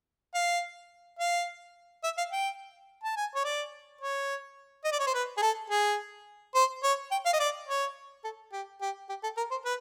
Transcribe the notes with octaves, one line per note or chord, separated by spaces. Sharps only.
F5
F5
E5
F5
G5
A5
G#5
C#5
D5
C#5
D#5
D5
C#5
C5
B4
G#4
A4
G#4
C5
C#5
G5
F5
D#5
D5
C#5
A4
G4
G4
G4
A4
A#4
C5
B4